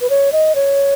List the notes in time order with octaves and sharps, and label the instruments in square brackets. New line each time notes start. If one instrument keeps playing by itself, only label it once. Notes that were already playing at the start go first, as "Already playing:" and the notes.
[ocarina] B4
C#5
D#5
C#5